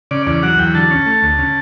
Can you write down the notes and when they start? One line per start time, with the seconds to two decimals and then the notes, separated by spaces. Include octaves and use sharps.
0.11 C#3 D5
0.27 E2 D5
0.43 F#3 F#5
0.59 E2 G5
0.75 D3 A5
0.91 C#4
1.06 A3
1.23 D2
1.39 C#3